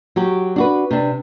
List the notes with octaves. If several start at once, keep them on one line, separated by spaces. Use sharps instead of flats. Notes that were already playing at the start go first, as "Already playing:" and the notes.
F#3 F#4 G4
D4 F#4 B4
C3 D4